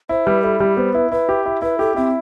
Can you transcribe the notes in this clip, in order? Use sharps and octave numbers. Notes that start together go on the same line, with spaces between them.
E4 C5
G3 B4
E4 A4
G3 G4
B3 C5
E4 B4
E4 B4
G4
E4
E4 B4
G4 A4
C4 E4